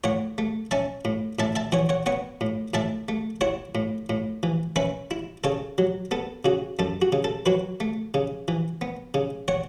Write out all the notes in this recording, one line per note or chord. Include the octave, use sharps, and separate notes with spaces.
A2 C#5 F#5
A3
C#4 E5 A5
A2
A2 E5 A5
E5 A5
E3 C#5 F#5
C#5 F#5
B3 C#5 F#5
A2
A2 E5 A5
A3
E4 C#5 F#5
A2
A2
E3
C#4 B4 E5
E4
C#3 A4 C#5
F#3
B3 A4
C#3 F#4
F#2 A4
F#4
C#3
A4
F#3 F#4 B4
A3
C#3
E3
B3
C#3
C#5 F#5